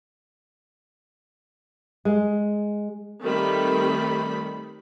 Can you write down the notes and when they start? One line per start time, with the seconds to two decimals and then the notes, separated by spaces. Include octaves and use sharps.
2.05 G#3
3.22 D#3 G3 A3 C4 B5